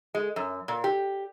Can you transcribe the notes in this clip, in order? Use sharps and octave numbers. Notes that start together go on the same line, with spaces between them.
G#3
F#2
A#2
G4